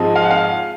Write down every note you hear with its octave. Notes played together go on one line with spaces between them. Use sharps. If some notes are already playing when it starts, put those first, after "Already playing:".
Already playing: G#2 F3 G#3 C4 D#4
F5
F#5
F5